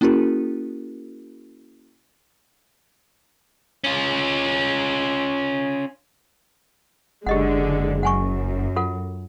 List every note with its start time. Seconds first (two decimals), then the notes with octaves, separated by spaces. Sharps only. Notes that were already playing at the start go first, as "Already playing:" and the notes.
0.01 A#3 C#4 E4 F#4 G#4 A#4
3.84 C#4 F4
7.27 F#1 D3 G#3 G4 D#5 F#5
8.03 F#2 F#5 G#5 C#6
8.76 F4 A4 F#5